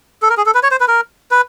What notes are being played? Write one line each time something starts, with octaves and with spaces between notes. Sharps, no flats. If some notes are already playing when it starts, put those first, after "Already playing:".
A4
A#4
G#4
A4
B4
C#5
C5
B4
A#4
B4